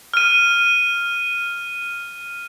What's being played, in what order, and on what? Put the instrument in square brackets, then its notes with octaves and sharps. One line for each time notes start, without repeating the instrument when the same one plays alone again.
[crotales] F6 D#7